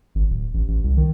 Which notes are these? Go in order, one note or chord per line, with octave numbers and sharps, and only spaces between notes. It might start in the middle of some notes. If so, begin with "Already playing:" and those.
G#1
D1
A1
A1
C2
D#3